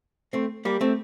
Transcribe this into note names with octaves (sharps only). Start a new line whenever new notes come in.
A3 C4
G3 A#3
A3 C4